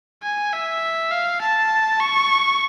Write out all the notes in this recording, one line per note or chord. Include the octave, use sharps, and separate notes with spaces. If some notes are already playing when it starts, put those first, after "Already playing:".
G#5
E5
F5
A5
C#6